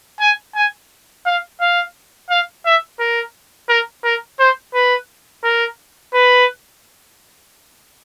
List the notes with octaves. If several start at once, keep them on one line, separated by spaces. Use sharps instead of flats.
G#5
G#5
F5
F5
F5
E5
A#4
A#4
A#4
C5
B4
A#4
B4